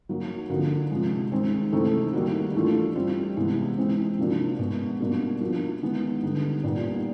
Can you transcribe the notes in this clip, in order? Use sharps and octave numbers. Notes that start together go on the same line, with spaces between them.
F#3 A#3 D#4
D3 F3 A#3 D#4 F#4
C3 F3 G#3
D#3 G#3 C4
C3 E3 A3 C4 D#4
D#3 G3 A#3 D#4 F#4
E3 A3 D4 F4
G3 C4 F4
C3 E3 G#3 B3 E4
E3 G#3 C4
C3 F3 A#3 D4 F#4
B2 G#3 B3
B2 G3 A#3 D4 F#4
F3 A#3 D4 F#4
D#3 G#3 B3 E4
D3 G3 B3 D#4
A#2 G3 B3 D#4